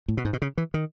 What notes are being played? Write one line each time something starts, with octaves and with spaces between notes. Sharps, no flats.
A2
B2
G#2
B2
C#3
E3
D#3